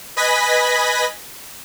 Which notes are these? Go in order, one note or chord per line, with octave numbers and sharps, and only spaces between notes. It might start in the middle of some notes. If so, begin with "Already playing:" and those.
B4 D#5 G#5 B5 A#6 B6